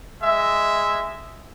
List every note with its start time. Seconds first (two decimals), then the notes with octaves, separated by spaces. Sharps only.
0.22 G#3 E5